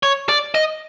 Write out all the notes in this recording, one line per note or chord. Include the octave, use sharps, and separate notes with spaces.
C#5
D5
D#5